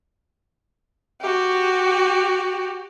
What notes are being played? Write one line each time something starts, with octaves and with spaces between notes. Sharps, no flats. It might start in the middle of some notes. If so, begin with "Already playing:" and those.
F#4 G4